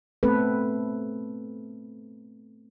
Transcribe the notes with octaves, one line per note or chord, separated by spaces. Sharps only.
A3 B3 C4 A4 B4